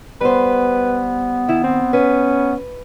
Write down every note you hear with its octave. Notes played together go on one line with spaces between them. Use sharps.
G3 B3 B4 C5
D#3 E4
C4
C#4 B4